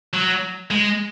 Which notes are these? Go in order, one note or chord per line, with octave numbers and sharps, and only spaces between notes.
F#3
G#3